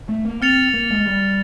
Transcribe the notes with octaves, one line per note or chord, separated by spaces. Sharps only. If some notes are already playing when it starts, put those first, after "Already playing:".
A3
A#3
C4 F6 A6 C#7 F7
A#3
G#3
G3